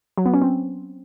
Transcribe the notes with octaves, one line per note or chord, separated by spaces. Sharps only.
F#3
B3
C#4
C4